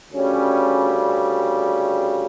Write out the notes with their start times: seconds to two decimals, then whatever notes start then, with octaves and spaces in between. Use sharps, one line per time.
0.11 D2 C#3 G3 C#4